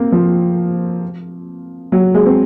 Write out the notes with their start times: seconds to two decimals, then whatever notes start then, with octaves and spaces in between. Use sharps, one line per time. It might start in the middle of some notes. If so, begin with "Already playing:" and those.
Already playing: A#3 C4
0.12 F3
1.92 F#3
2.14 G#3
2.26 C4